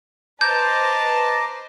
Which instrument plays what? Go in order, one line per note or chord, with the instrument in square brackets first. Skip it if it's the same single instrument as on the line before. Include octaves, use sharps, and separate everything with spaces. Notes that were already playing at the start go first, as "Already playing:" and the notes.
[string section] B4 C5 D#5 [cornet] A5 [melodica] A#5 D6 [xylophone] G6